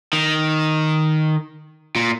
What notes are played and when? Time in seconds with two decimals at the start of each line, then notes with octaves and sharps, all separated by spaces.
0.13 D#3
1.96 A#2